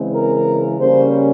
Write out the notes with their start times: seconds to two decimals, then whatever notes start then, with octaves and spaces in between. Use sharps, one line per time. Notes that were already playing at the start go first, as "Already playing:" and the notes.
Already playing: C#3 E3 G#3 C4
0.13 A#4
0.79 C#3 G3 A#3 C#4 C5